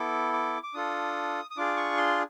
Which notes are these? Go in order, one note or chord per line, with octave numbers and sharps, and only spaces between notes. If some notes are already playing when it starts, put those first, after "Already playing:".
Already playing: B3 E4 A4 D6
D6
D6
D4 F4 A4 D#6
D#6
D4 F4 G#4 D6
C#6
C6